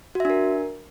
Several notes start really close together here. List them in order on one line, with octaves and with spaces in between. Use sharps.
F#4 E5 D4 A#4